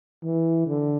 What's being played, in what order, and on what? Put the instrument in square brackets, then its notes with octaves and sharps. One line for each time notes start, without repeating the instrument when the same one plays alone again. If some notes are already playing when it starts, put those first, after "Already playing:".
[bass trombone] E3
D3